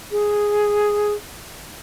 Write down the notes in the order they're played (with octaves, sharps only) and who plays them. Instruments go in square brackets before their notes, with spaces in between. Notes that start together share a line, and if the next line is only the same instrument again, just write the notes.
[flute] G#4